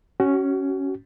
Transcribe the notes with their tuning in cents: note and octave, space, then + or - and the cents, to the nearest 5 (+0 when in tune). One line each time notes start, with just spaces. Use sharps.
C#4 +0 F#4 +30